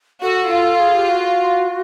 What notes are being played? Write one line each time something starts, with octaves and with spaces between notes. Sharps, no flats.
F#4 A4
F4
G#4
G4
F#4